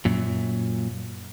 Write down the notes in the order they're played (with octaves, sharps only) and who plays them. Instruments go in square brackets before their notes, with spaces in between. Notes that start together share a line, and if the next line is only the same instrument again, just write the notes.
[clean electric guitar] F#2 A#2